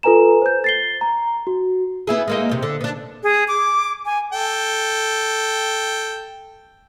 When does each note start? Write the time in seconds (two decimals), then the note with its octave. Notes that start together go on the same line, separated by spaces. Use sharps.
0.03 F4 A4 B4 G#5 A#5 E7
0.42 C5 G6
0.64 A6 C7 G7
1.01 A#5
1.47 F#4
2.07 B3 E4 G#4
2.28 G#3 A#3 D#4
2.49 E2 C3
2.63 D3
2.81 B3 D4
3.23 G#4
3.48 D6
4.06 G#5
4.32 A4 G5